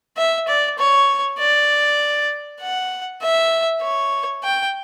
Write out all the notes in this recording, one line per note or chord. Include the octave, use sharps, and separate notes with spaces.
E5
D5
C#5
D5
F#5
E5
C#5
G5